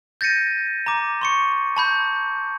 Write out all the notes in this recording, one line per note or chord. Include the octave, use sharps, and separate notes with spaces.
G6 A6 A#6 C#7 D#7
A#5 D6
C6 C#6 C#7
A5 B5 G6